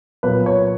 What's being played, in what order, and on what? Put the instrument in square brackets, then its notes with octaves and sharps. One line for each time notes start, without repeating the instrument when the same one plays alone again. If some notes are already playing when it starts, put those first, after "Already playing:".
[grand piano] A#2 F#3 B3 B4
C#5